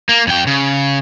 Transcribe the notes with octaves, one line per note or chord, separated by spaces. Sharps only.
A#3
F2 G5
C#3